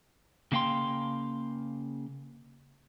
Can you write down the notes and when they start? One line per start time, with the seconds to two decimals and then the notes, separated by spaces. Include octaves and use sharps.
0.52 C#3 A#3 F5 G5 C6